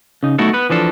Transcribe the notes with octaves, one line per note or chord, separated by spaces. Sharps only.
C#3 D#4
B1 A3 D#4 E4 F#4 A4
B3 B4
E3 F3 D4 A4